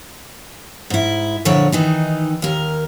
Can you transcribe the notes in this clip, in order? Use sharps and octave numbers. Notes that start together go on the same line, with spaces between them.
G#2 E4
F2 A#2 D3 E4 C#5
D#3 E3 D#4
D#2 A#4